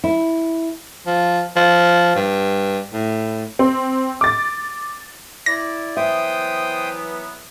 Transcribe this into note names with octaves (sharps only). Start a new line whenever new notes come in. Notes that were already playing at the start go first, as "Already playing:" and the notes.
E4
F3
F3
G2
A2
C4
D6 A6
E4 D5 A#6
E3 F#3 B3 C5 E5 G5 D#6